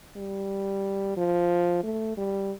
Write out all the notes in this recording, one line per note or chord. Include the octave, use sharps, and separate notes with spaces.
G3
F3
A3
G3